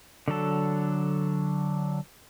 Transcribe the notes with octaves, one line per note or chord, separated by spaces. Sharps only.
D3 F#3 A4